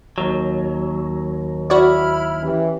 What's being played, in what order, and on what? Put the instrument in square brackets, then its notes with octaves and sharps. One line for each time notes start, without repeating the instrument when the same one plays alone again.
[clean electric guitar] D#2 F#3
[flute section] E4 B5 F6 [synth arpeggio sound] F#4 C#5 D5
[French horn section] E3 C#4 G4